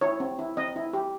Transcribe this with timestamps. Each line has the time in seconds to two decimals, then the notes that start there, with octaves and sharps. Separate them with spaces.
0.01 E4 C#5
0.20 C4
0.39 E4
0.57 C4 D#5
0.76 E4
0.93 G4